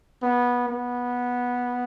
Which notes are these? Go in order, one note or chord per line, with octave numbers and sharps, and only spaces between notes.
B3
B3